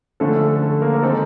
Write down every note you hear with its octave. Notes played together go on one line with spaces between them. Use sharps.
D3 F3 A3 C#4 A4
A4
A4
A#3 A#4
A#4
D#3 G#3 C4 D#4 A4